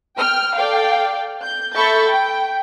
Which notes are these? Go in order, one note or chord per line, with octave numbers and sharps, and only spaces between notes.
G5 F6
A4 D5 F5 G5
G6
A4 E5 B5 C#6 G6 A6
G5